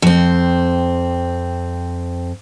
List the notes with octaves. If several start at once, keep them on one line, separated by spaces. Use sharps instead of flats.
F2 C4